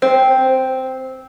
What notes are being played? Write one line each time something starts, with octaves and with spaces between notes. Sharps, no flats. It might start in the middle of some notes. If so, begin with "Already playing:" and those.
C4